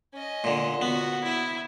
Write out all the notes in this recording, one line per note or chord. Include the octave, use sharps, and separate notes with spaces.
C#4 D#5
A#2 D3
B3 F#4
E4